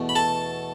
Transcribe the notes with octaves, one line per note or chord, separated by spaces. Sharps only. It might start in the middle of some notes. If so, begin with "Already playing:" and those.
Already playing: E2 B2 A3
B5
A4 A5